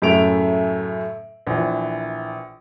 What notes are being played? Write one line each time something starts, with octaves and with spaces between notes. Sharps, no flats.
F#2 A2 C#3 A3 D7 F7
A#1 E3